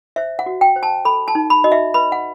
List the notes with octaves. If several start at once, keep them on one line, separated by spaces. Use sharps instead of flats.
C5 E5
F#5
F#4
G5
C5
A5
A4 B5
A5
D#4
B5
F#4 D#5
E5
B4 B5
F#5